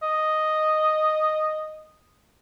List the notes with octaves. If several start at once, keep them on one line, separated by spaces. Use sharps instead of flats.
D#5